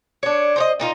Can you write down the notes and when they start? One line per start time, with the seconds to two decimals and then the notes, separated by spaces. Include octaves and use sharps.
0.23 D4 C#5
0.56 C5 C#5 D#5
0.80 A#2 D#4 F4